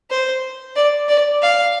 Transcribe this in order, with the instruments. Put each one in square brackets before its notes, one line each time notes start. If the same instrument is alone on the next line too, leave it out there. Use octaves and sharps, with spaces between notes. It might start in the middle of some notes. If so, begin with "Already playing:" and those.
[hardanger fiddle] C5
D5
D5
F5